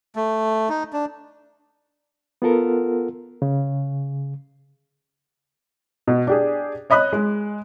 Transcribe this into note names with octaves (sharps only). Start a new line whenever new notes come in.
A3
D#4
D4
B3 F4 A4 A#4
C#3
B2
D4 G4 G#4
C#5 D#5 B5 D#6 F#6
G#3